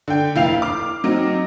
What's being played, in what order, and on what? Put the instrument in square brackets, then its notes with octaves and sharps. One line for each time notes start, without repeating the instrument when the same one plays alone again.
[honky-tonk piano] D3 G5
F1 E4 F5 C7 F7
D6 F6
F#3 C4 D#4